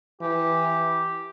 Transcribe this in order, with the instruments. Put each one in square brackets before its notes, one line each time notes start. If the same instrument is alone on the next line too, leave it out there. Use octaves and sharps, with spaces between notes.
[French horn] E3 [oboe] G4